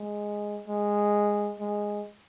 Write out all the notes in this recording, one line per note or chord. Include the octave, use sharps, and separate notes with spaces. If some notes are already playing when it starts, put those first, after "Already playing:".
Already playing: G#3
G#3
G#3